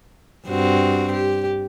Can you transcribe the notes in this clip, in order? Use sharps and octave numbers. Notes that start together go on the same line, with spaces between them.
G2 C4 F#4
G4